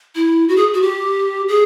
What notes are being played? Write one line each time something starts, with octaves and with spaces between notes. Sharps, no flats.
E4
F#4
G#4
F#4
G4
G#4